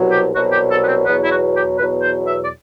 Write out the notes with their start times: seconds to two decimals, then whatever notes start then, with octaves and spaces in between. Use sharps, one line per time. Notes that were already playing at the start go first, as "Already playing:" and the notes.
Already playing: C2 B2 F#3
0.11 G4
0.35 C2 B2 F#3 F#4
0.52 G4
0.71 A4
0.84 B3
0.88 C4
1.06 E2 B2 F#3 B3
1.22 E4
1.30 F#4
1.55 G4
1.78 E2 B2 F#3 B4
2.02 C5
2.26 E5
2.44 D5